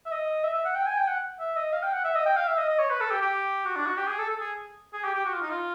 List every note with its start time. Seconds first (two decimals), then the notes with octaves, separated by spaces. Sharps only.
0.06 E5
0.11 D#5
0.43 E5
0.54 E5
0.65 F#5
0.76 G5
0.87 G#5
0.97 G5
1.08 F#5
1.40 E5
1.56 D#5
1.73 F5
1.83 G5
1.93 F#5
2.04 E5
2.15 D#5
2.26 G5
2.37 F5
2.47 E5
2.57 D#5
2.69 D#5
2.79 C#5
2.90 B4
3.01 A4
3.11 G4
3.22 G4
3.65 F#4
3.76 D4
3.86 F#4
3.97 G4
4.08 G#4
4.18 A4
4.30 A4
4.40 G#4
4.93 G#4
5.04 G4
5.15 G4
5.25 F#4
5.34 F4
5.42 D#4
5.50 F4